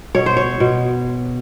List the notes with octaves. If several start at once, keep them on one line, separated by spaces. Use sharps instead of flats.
B2 C#5
C5
C#5
B2